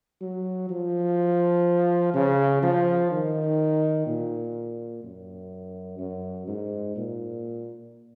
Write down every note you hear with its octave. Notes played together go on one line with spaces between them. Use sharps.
F#3
F3
C#3
F3
D#3
A#2
F#2
F#2
G#2
A#2